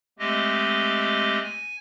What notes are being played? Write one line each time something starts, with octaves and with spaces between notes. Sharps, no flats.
G#3 A3 C4 G4 D#5
G#5